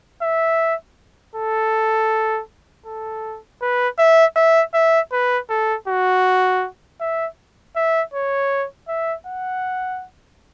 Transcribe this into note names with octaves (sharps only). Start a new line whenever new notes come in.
E5
A4
A4
B4
E5
E5
E5
B4
A4
F#4
E5
E5
C#5
E5
F#5